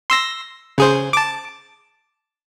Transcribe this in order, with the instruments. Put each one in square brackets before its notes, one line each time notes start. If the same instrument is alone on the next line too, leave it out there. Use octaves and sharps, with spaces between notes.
[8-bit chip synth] C6 E6 A#6
C#3 G#4 C5
A5 D6